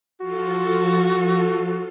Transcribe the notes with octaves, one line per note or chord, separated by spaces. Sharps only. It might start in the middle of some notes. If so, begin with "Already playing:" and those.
F3 F4 F#4 A4